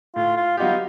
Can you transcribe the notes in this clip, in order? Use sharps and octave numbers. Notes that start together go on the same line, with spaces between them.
A2 F4
F4
F#3 B3 D#4 F4 G4